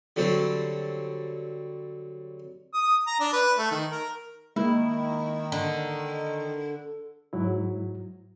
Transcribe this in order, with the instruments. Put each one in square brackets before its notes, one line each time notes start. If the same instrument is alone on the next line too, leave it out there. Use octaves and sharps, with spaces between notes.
[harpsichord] D3 F#3 G3 C4
[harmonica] D#6
A#5
D4
B4
A3
D#3
A#4
[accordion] D#3 [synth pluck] G#3 A#3 [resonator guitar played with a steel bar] E4
[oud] D3
[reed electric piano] G#2 F#3 E4